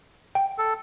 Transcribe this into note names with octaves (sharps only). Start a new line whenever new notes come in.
G5
A4